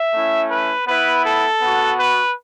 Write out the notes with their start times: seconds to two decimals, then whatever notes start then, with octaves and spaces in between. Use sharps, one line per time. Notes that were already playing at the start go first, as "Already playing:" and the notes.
Already playing: E5
0.14 A3 C#4 E4
0.51 B4
0.87 B3 E4 B4
1.25 A4
1.62 B3 F#4
1.99 B4